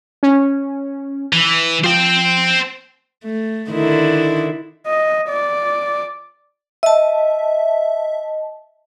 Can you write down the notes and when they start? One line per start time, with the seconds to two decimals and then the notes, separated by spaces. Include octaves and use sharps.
0.23 C#4
1.33 E3
1.84 F3 C5 G5
3.25 A3
3.70 D3 D#3 E4
4.87 D#5
5.29 D5
6.83 D#5 E5 A5